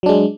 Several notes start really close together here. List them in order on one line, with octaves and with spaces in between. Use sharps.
F#3 D4 G#3